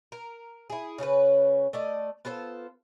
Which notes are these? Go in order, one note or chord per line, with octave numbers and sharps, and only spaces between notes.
A#4
E4 G#4
C#3 C#4 E4 B4
A3 D5 D#5
B3 F4 A4 C5